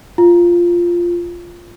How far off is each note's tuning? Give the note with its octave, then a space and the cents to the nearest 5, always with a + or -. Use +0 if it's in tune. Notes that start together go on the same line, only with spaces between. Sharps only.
F4 -5